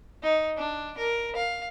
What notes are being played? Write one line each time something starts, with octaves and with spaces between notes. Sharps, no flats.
D#4
D4
A#4
F5